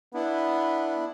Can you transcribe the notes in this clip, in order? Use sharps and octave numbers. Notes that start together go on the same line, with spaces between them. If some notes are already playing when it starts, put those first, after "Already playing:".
B3 D4 E4